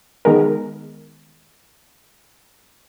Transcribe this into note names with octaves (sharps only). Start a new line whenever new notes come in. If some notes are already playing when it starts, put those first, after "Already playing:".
D#3 G#3 B3 A#4